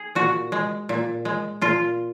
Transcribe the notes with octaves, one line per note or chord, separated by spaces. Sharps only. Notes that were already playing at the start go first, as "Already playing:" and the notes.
Already playing: G#4
A#2 F#4
G#3
A#2
G#3
A#2 F4